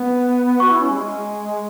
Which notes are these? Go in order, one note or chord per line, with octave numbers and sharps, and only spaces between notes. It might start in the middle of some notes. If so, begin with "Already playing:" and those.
Already playing: B3 F#5
F#4 C#6
E4
C#4
G#3